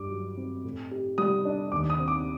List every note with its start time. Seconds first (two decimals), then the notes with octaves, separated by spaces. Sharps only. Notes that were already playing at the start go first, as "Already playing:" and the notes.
Already playing: G2 G4 D6
0.10 F#3
0.37 C4
0.64 A2
0.91 G4
1.18 G3 D#6
1.45 D4
1.72 D#2 D6
1.90 D#6
1.99 C4
2.08 D6